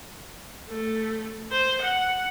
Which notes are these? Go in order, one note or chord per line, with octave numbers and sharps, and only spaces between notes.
A3
C5
F#5